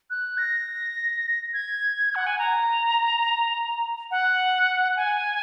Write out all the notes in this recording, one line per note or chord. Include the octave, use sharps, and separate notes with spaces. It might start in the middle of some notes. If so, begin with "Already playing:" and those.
F#6
A#6
G#6
F#5
G#5
A#5
F#5
G#5